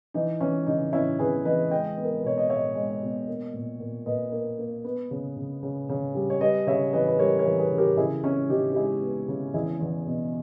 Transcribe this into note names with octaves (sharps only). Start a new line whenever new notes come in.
E3 D#4
E3 C#4
C#3 D#4
E3 C#4 E4
E2 G#4 B4
E3 B4 D#5
G#3 D#5 G5
B3
A#4
B4
B2 C#5
D#5
G#3 C#5 E5
G#3
B2
A#3
A#2
A#2
A#2 B4 D#5
A#3
A#3
B3
C#3
C#3
C#3
C#3
G3
C#5
G3 B4 D#5
C#3 C#5 E5
E3 B4 D#5
B4
G3 A#4 C#5
A#4 C#5
E3
G#4 B4
C#3
G4 A#4
C#3 E4 G#4
C#3 C#4 E4
C#3 D#4 G4
G4
G#3 E4 G#4
B3
C#3
E2 E4 G#4
E2
B2